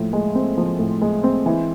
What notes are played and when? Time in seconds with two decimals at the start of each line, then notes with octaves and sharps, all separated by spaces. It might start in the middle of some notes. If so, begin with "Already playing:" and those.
Already playing: A2 F3
0.13 G#3
0.35 C4
0.58 F3
0.79 A2
1.01 G#3
1.24 C4
1.46 E3